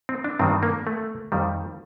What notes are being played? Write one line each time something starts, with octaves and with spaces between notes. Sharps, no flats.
C4
D4
G2 D#3 G3 C4
A#3
A3
F2 D#3 G3